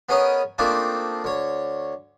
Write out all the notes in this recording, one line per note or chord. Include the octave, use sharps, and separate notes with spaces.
B3 C#4 G#4 A#4 C#5 D#5
A3 A#3 C4 D4 D#4 F4
D2 C#5